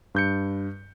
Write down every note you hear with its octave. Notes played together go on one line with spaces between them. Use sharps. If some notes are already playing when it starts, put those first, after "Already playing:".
G2 G6 C#7